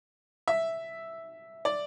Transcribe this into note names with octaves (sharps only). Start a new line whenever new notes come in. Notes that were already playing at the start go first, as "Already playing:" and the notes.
E5
D5